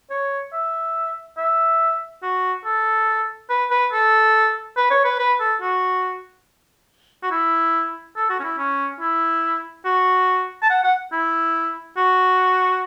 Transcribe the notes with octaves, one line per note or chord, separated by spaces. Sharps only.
C#5
E5
E5
F#4
A4
B4
B4
A4
B4
C#5
B4
B4
A4
F#4
F#4
E4
A4
F#4
C#4
E4
C#4
E4
F#4
A5
F#5
F#5
E4
F#4